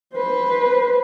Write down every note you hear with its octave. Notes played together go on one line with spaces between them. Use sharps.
B4 C5